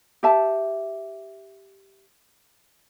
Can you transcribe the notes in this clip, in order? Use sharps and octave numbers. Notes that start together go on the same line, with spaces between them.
G4 E5 A5